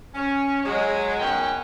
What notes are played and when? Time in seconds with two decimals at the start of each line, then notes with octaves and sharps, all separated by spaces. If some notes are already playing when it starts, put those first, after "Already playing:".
0.15 C#4
0.64 F#3 G#3
1.19 F#2 B2 D#3 C#4 F#5 G5